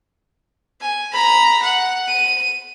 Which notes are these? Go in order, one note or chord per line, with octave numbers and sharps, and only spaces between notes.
G#5
A#5 B5
F#5
D#7